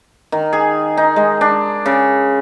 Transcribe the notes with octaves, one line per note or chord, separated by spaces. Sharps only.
D#3
G#4
D#4
G#3
D4
C#3